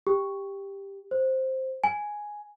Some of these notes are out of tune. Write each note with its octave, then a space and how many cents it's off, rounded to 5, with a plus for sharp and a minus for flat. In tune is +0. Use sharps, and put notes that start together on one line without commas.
G4 +10
C5 +5
G#5 +5